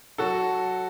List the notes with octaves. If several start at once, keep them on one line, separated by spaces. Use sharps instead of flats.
F#3 F#4 A4